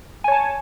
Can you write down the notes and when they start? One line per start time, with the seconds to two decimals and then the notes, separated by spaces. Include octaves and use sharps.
0.24 G#5
0.28 C#5
0.32 A5